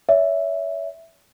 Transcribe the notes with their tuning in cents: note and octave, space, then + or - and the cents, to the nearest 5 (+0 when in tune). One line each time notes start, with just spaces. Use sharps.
C#5 +35 E5 +0